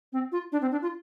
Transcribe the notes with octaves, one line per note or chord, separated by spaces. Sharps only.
C4
F4
D4
C4
D4
F4